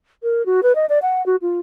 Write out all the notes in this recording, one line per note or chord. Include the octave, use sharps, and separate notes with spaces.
A#4
F#4
B4
D#5
D5
F#5
F#4
F4